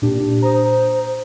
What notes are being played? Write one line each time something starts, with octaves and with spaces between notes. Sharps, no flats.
A#2 D4 G4
C5 A#5 D#6